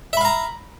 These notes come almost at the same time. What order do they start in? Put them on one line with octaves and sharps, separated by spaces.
E5 B5 F5 A#5